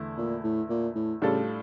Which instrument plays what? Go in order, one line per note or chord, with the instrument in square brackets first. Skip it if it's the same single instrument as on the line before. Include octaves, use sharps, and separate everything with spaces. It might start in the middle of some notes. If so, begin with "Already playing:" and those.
Already playing: [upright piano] E2 D3 A3 E4
[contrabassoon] A#2
A2
A#2
A2
[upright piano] A2 G3 D4 F4 A4 [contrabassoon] C#3